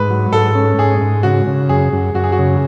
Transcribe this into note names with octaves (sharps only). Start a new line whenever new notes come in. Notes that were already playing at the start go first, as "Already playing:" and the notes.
Already playing: G#2 B4
F#3
G#2 A4
C#4
G#2 G#4
G#2
C#3 F#4
C#3
F#2 G#4
F#2
F#2 F#4
G#4
F#4
C#3